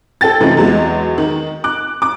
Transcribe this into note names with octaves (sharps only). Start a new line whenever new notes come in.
A4 G5 A6
F#2 C3 E3 A3 D#4 F4
E2 F#3 G#3
D#3
D6 F#6
D6